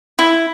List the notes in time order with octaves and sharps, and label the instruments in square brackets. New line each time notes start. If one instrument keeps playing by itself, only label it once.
[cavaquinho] E4